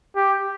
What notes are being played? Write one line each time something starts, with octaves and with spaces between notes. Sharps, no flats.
G4